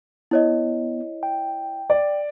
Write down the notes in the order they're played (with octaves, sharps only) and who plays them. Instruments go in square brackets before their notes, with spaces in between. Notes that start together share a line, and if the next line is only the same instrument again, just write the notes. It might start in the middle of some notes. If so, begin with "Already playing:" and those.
[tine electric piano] B3 [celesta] E4 C#5 D#5
[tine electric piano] G5
[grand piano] D5